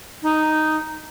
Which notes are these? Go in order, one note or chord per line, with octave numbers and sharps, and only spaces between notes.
D#4